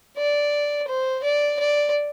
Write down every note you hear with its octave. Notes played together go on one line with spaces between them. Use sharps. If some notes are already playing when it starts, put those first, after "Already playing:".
D5
C5
D5
D5